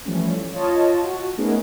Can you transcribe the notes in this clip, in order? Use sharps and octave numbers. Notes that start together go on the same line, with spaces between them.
E3 F3 G3 A3 C#4
F4 C#5 D#5 A5
F#4
A3 B3 C#4 D#4 G#4 A#4